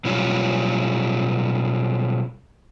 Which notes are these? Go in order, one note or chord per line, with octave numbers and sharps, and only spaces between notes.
B2 F#3 G3 C#4 E4 F4